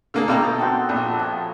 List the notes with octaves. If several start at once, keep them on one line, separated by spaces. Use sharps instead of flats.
D3 A#3 G#4
B2 A3 A#3 G5 A#5 E6
D#4 A4 G5
C4 F#4 C6
A#1 A3 D4
F3 C#5